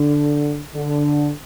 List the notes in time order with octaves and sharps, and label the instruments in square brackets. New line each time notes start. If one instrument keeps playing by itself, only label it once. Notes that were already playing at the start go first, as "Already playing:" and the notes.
Already playing: [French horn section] D3
D3